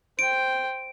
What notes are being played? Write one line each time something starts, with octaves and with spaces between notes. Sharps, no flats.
C5 G5 D7